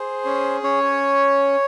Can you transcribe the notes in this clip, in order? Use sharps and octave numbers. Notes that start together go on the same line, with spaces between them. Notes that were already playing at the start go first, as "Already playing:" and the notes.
Already playing: G#4 C5
C#4
C#4 C#5